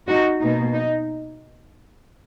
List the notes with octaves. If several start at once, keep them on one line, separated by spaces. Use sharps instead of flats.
D#4 F#4
B2 A#3 D#4
D#4